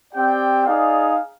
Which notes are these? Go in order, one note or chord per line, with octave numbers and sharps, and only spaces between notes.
C4 G4 D5 G5
D#4 G#4 D5 F5